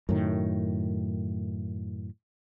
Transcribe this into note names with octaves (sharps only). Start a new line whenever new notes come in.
F#2 A2 D#3